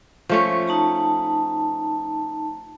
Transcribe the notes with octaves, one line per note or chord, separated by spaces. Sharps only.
F3 A3 C#4
D#4 A5 A#5